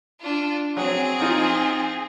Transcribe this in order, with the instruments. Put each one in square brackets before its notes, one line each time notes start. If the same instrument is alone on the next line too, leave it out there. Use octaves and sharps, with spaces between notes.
[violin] D4 F4
[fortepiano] F#3 F#5 [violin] C4 G#4
[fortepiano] F3 D#4 F4